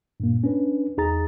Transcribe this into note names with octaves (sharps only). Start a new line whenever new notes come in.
G2 A#2 A#3
C#4 D4 B4
E2 D#4 G#4 A#5 A6